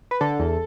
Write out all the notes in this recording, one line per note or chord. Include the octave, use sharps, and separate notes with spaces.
B4
D3 A4
E2